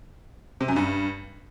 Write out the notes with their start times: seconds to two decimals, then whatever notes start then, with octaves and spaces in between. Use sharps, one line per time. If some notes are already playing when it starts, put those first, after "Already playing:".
0.61 C3
0.68 F#2
0.76 G2